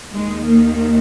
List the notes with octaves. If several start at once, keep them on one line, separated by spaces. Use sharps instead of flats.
D#2 D#3 G#3
A#3